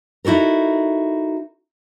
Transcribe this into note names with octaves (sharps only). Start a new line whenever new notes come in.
D#4 E4 F#4 A4 A#4